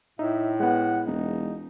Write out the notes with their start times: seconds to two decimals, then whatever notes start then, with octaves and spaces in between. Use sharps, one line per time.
0.19 A2 D#4 E5
0.60 G#3 B3 F#5
1.06 E1 D#4